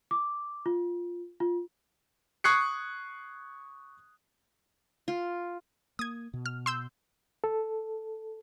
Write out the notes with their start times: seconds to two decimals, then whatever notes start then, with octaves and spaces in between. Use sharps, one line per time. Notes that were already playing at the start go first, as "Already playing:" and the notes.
0.11 D6
0.66 F4
1.40 F4
2.44 C#6 D#6 F#6 G#6 C7 C#7
5.08 F4
5.99 A#3 D#6 G#6
6.34 B2
6.46 F6
6.66 C6 E6 G6
7.44 A4